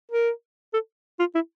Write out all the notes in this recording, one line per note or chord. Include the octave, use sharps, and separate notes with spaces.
A#4
A4
F4
E4